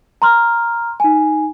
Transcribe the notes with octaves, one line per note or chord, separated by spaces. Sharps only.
A#5 C6 F6
D#4 G#5